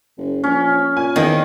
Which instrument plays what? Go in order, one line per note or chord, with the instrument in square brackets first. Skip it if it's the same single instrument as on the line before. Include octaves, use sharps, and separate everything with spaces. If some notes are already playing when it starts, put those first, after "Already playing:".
[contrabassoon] F#1
[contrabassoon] A#1 [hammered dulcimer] C#4
[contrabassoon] A#2 [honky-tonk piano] G#5
[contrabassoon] E2 [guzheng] D#3 [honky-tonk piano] A#3 C4 D#4